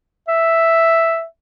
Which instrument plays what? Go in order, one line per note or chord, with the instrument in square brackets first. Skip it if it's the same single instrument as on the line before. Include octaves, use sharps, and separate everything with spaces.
[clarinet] E5